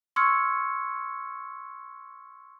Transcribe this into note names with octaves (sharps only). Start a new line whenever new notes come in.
C6 C#6 E6 F6 G#6 C#7